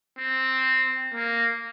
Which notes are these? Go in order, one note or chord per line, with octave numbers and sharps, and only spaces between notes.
C4
A#3